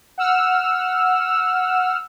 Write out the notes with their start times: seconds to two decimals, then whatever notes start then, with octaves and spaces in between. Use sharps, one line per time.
0.18 F#5 E6 F6